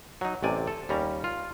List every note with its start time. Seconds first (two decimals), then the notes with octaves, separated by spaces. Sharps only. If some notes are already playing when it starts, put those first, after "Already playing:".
0.21 F#3 D#4
0.43 A1 C3 D5 G#5
0.67 A4
0.89 D#2 G3 C#4 A#5
1.24 F4